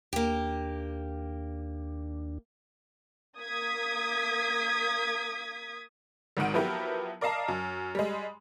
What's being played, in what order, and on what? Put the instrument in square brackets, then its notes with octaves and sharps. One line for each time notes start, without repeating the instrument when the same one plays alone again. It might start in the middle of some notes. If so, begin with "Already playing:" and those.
[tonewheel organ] D#2 D4 [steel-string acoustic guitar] A#3 G4
[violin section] A#3 D#6 G#6 B6
[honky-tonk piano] G#1 G#2 D#3 F#5 D7
F3 F#3 B3 E4 G4 A#4
A#4 D5 D#5 F5 A5 A#5
F#2
G3 G#3